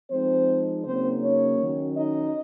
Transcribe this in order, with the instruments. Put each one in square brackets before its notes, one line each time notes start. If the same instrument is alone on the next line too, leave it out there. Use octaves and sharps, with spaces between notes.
[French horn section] F3 G#3 C4 D#4 C5
C#3 F#3 A#3 C4 D#4 C5
C#4 C#5
D#3 F#3 C#4
D#4 D#5